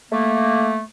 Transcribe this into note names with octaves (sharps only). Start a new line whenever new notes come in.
A3 A#3